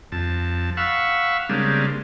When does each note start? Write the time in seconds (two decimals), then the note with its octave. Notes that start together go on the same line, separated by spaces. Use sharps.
0.12 F2 A5
0.77 F5 F#5 B5 C#6 E6
1.49 C#3 G3 G#3 A#3 C4 D4